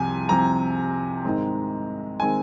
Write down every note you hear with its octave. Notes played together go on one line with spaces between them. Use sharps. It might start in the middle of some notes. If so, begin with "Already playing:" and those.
Already playing: C2 C3 F3 C4 G#5
C2 C3 F3 C4 A#5
G#2 D#3 G#3 C4
D#3 G#3 C4 G#5